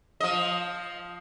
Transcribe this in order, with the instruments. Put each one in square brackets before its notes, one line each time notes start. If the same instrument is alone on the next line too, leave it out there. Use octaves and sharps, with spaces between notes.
[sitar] F3 D#5